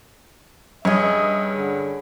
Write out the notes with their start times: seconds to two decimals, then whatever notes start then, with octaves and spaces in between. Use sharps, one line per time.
0.85 G2 C#4 G#4 D#5 E5
1.57 D3